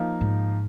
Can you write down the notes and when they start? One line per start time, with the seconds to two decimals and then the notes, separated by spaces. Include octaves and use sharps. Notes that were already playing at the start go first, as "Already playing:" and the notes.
Already playing: F3 A#3 D#4
0.21 G#2